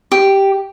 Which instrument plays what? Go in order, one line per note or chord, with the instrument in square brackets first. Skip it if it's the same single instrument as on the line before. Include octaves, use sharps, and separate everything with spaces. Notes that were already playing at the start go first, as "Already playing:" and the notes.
[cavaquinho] G4